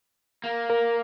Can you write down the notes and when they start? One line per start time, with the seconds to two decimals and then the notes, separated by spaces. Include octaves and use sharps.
0.44 A#3
0.70 A#4